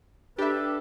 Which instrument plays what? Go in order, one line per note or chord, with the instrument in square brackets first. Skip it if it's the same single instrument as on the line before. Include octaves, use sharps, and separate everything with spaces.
[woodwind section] D4 A4 B4 [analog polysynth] G4 E5